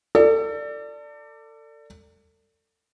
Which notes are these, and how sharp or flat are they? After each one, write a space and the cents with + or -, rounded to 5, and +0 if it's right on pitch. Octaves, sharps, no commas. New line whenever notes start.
A4 +35 D5 +0